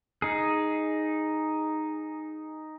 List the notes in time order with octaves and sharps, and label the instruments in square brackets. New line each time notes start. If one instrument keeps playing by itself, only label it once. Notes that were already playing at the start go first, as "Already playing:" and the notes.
[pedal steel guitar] D#4 G#4